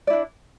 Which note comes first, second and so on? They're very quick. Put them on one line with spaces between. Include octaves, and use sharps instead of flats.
D5 E4 D4